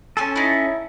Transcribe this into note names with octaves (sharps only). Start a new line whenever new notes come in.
C#4 A4 G#5 C6 E6
D#4 E4